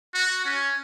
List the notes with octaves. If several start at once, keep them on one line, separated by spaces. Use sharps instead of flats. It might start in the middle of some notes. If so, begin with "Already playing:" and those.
F#4
C#4